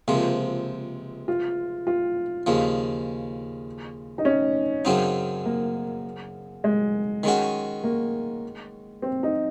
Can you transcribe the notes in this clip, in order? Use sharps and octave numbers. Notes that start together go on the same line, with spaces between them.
C#2 C3 F3 A#3
F4
F4
D#2 C#3 F3
D#4
C#4
F#2 C#3 F#3 C4 D#4
A#3
G#3
D#3 G#3 C#4 F#4
A#3
C4
D#4